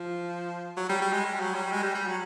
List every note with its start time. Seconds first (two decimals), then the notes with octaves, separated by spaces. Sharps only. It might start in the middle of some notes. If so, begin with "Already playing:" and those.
Already playing: F3
0.77 F#3
0.89 G3
1.01 G3
1.12 G#3
1.25 G3
1.40 F#3
1.55 G3
1.72 G#3
1.83 G3
1.95 G3
2.07 F#3